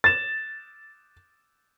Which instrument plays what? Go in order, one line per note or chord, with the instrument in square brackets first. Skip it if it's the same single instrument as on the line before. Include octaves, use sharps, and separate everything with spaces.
[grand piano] A6 E7